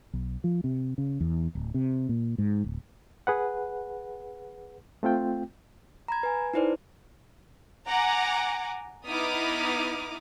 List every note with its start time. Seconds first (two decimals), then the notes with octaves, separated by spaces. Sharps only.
0.13 B1
0.44 F3
0.64 C3
0.98 C#3
1.20 E2
1.55 D1
1.74 C3
2.09 A#2
2.38 G#2
2.64 D1
3.27 G#4 B4 F#5
5.03 A3 C4 F4 G5
6.08 A#5 B5 G#6
6.23 B4 G#5
6.54 D#4 E4 B4 C5 D5
7.87 F#5 G#5 A#5 D6
9.06 B3 D#4 E4 D6 D#6 F6